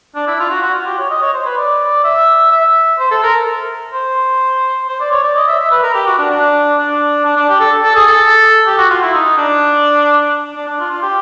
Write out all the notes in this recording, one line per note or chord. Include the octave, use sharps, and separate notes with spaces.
D4
E4
F4
F#4
F#4
F4
G4
C#5
D#5
C#5
C5
B4
D5
E5
E5
C5
A4
A#4
C5
C5
D5
C#5
D5
D#5
E5
E5
B4
A#4
G4
F#4
D4
D4
D4
D4
D4
G4
A4
A4
G#4
A4
G4
F#4
F4
E4
D#4
D4
D4
D4
F4
F4
G4